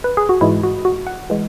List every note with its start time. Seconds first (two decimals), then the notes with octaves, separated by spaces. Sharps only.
0.04 B4
0.17 G#4
0.29 F#4
0.41 G#2 E3 G#3 E4
0.64 F#4
0.85 F#4
1.07 F#5
1.30 E3 G#3